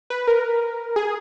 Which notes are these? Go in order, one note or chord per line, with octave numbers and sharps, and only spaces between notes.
B4
A#4
G#4